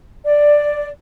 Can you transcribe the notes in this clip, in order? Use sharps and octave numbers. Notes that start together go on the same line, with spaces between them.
D5